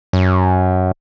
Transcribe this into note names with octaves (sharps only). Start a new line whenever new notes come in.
F#2